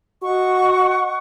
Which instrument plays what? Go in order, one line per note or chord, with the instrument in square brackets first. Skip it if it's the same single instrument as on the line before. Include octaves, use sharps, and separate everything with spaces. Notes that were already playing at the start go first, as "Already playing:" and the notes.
[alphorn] F#4 [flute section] D#5 F#5 C#6